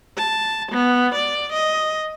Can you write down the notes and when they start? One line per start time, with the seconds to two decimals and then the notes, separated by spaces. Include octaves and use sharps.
0.18 A5
0.72 B3
1.15 D5
1.53 D#5